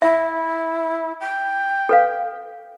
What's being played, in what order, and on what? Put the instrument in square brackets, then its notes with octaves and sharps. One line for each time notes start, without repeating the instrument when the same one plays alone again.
[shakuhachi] E4 [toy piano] E5
[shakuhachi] G5
[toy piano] A4 B4 F5